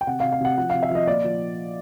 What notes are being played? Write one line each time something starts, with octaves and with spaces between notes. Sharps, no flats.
G5
C3 F#5
F5
C3
F5
C3 F#5
F3 F#5
C3 F5
E5
F3 D#5
A#2 D5
F3